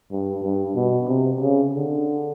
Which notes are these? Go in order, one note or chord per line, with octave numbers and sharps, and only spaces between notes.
G2
G2
B2
C3
C#3
D3